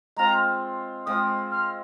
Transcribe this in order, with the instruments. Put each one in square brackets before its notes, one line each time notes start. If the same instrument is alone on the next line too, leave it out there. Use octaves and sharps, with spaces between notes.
[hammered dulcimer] G#3 C4 F4 [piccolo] A#5
[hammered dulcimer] G#3 C4 F4 [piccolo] D#6
[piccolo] F6